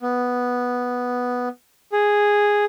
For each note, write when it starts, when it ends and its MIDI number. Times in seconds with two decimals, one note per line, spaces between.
0.01 1.49 59
1.92 2.65 68